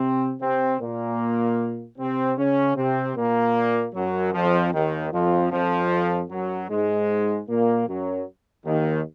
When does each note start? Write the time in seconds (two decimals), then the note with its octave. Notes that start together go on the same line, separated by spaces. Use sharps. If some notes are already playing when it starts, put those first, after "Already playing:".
Already playing: C3 C4
0.40 C3 C4
0.79 A#2 A#3
1.97 C3 C4
2.37 C#3 C#4
2.76 C3 C4
3.16 A#2 A#3
3.94 F#2 F#3
4.33 F2 F3
4.72 D#2 D#3
5.12 F2 F3
5.51 F2 F3
6.29 F#2 F#3
6.69 G#2 G#3
7.48 A#2 A#3
7.87 F#2 F#3
8.65 D#2 D#3